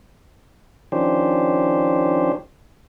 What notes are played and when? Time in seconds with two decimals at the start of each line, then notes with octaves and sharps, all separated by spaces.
0.92 D#3 F3 C#4 D4 G4 C5